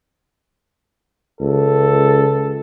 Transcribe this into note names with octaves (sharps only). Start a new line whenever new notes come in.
C#2 A4